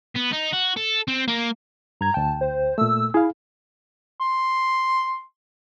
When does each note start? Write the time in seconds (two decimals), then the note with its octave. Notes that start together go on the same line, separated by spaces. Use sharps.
0.16 B3
0.33 D#4
0.53 F#4
0.77 A4
1.08 C4
1.28 A#3
2.01 G2 A#5 G#6
2.14 D2 G5 A5
2.41 C5
2.78 A#2 A3 E6
3.14 E4 G#4 F5
4.21 C6